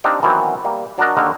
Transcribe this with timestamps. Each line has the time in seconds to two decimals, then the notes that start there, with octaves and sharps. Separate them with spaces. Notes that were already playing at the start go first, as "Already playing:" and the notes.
0.04 C4 D4 D#4 G4 F5
0.22 D#3 E3 F#3 B3 C4 D#4
0.64 G3 A#3
0.98 F#3 D4 F#4 A#4 D#5
1.17 D#2 D3 F#4 A#4 D#5